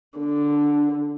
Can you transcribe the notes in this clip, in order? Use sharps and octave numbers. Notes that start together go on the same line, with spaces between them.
D3